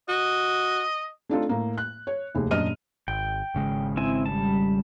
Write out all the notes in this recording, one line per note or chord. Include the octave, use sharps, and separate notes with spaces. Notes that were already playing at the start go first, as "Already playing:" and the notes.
F#4 D#5
A3 C4 D4 D#4 F4 A4
A2 A#3
F#6
C#5
F1 D#2 G#4
D#1 F#2 D4 D#5 F6 D#7
G#1 G5
G#1 C#3 G#3
C4 E4 G#5
G3 A5